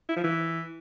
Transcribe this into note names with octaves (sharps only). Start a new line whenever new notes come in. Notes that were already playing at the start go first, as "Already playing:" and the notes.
E4
F3
E3